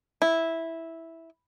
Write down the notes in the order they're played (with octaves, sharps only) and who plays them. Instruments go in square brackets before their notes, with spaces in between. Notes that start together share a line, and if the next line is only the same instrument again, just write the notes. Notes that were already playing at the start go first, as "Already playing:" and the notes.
[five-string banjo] E4